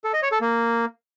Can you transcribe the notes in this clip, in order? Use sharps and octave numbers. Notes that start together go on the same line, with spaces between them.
A4
D#5
C#5
A4
A#3